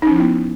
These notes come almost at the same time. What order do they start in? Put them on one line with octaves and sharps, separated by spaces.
D#4 C#4 F3 E4 B3